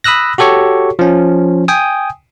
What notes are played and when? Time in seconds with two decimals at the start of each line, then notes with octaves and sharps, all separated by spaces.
0.04 B5 D#6 E6 F#6 A#6
0.38 F#4 G4 A4 C#5 C#6
0.99 F3 C#4
1.68 G5 G#5 D#6